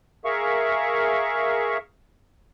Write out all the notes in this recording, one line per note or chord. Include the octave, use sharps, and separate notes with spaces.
G#4 A#4 E5 F5 C#6